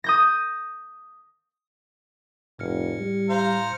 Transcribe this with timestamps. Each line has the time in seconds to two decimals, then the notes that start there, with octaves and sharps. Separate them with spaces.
0.04 D#6 G6 A#6
2.59 F1 A2 F6 C#7
3.00 G3
3.29 C5 F5 A#5